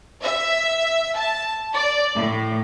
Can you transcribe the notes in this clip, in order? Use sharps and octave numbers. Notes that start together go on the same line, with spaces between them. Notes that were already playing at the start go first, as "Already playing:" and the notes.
E5
A5
D5
A2